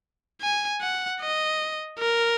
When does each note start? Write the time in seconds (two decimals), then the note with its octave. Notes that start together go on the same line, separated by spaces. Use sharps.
0.42 G#5
0.82 F#5
1.21 D#5
1.99 A#4